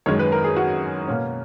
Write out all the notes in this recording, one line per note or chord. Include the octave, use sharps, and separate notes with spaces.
F#2 D#3 G#3 C#4 C#5
B4
A#4
G#4
F#4
B2 A#3 C#4